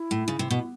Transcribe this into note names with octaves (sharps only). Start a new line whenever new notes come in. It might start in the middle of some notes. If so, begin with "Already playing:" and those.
Already playing: E4
A2
C#3
C3
B2